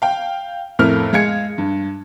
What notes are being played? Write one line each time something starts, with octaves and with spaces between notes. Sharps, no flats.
F5 G5
F2 A2 A3 A#4 F6
G#3 F5 G#6 C#7
G2